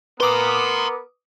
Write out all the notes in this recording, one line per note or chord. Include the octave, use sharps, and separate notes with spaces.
B3 A#4 B4 A#5 C6 D6 D#6